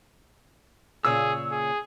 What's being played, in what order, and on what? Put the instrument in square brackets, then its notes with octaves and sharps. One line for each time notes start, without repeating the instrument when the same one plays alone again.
[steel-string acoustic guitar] A#2 C#3 C#5 [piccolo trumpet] G#4 [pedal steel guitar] E6
[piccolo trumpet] G#4